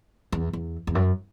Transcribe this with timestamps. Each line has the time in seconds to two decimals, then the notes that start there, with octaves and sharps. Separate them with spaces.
0.32 E2
0.53 E2
0.87 E2
0.95 F#2